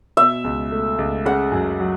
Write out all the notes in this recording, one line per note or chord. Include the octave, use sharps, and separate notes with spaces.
B2 E5
C#2
A3
C#2
C#3 F#5
F#2
F#3